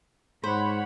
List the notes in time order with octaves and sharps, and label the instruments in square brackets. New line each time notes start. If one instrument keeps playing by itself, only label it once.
[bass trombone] G#2 [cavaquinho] C5 [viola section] C#5 F#5 B5